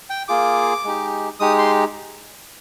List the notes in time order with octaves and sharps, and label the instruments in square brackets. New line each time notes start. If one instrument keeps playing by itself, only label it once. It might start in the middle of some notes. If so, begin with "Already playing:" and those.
[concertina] G5
A#3 F4 G#4 D6
G#3 D#4 G4
G#3 D#4 G4 D#6
C6